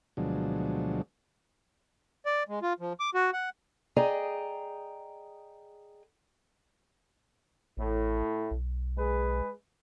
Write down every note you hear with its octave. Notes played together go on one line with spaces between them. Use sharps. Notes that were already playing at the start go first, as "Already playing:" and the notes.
D2 B2 F3 F#3 G#3 D4
D5
G#3
F4
F3
D6
F#4
F#5
G#4 D5 D#5 G5 A#5
A1 A2
B1
G#3 G#4 B4